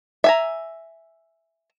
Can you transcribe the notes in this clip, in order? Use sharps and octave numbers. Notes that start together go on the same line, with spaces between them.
E5 G#5 A#5